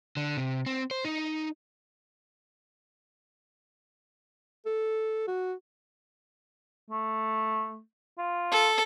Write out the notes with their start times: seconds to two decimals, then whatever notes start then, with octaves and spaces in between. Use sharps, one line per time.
0.17 D3
0.37 C3
0.66 C4
0.91 C5
1.05 D#4
4.66 A4
5.27 F#4
6.90 A3
8.18 F4
8.51 A4